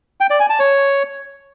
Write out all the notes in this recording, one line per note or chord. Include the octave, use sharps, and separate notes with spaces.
G5
D5
G#5
A5
C#5